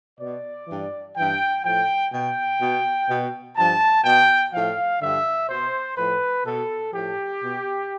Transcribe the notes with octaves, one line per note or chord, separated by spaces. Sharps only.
B2 D5
G2 E3
G2 E3 G5
A2 F3 G5
B2 G5
B2
B2
G2 F3 A5
B2 G5
A2 F3 F5
G2 D3 F3 E5
B2 C5
A2 F3 B4
B2 A4
A2 F3 G4
B2